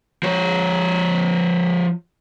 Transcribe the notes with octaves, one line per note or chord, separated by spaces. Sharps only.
F3 C#5